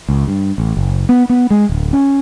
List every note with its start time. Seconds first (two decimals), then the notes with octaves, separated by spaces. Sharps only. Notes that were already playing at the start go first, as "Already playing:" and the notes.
0.09 C#2
0.28 G2
0.58 A1
0.77 F#1
1.09 B3
1.30 B3
1.50 G#3
1.69 D1
1.93 C#4